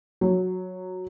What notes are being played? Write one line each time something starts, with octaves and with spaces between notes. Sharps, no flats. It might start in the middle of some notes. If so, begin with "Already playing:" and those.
F#3